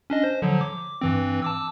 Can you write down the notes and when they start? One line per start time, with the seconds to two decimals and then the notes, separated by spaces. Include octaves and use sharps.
0.10 C#4 D4 D#5
0.23 C5
0.42 D3 F3 F#3
0.61 D6
1.01 G2 E3 C4
1.42 A5 D6 E6